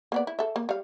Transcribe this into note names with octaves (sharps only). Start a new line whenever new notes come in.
A#3 B3 D5
E4
A4 E5
A#3
G3 F5